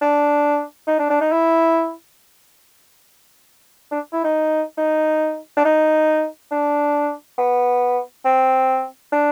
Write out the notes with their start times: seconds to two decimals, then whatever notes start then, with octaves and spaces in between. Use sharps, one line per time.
0.02 D4
0.87 D#4
0.99 D4
1.10 D4
1.21 D#4
1.32 E4
3.92 D4
4.13 E4
4.24 D#4
4.78 D#4
5.57 D4
5.65 D#4
6.52 D4
7.38 B3
8.25 C4
9.12 D4